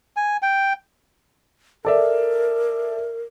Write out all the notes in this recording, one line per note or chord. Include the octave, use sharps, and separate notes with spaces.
G#5
G5
A4 A#4 D5 E5